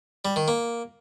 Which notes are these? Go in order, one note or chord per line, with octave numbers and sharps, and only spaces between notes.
G3
D#3
A#3